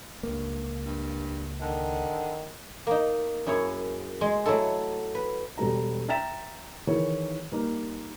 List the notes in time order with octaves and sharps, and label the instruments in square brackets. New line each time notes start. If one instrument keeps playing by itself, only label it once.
[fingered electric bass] C#2 A#3 [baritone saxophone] G2
[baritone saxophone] G2
[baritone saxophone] D3 [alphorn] D#3
[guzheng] A#3 D#4
F#2 E4 G#4 C#5
G#3 C6
F#3 A3 E4 A4
B4
[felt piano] E1 G3 A4 A#5
E5 G5 A#5 A6 B6 E7
D#3 E3 E4 G#4 A#4 C#5
G3 A#3 D#4